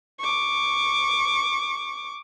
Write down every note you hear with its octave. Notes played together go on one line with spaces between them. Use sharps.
C#6 D6